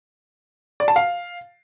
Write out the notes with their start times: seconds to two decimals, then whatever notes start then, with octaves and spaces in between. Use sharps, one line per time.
0.80 D5
0.88 A5
0.96 F5